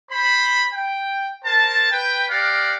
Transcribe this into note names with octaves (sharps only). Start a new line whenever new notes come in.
C5 B5
G5
A#4 C5 A5
B4 G5
G4 A#4 D5 F5 F#5